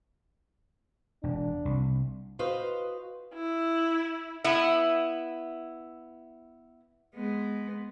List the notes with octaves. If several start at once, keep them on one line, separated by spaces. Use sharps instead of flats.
E1 D4
C2
F#4 B4 C5 D#5 F5
E4
B3 E4
G#3 B3